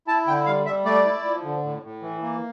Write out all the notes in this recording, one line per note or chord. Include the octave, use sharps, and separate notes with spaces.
E4 A5
D3 G5
G3 F5
G3 E5
A3 D5
E4
F3
D3
A2
A2
E3
A#3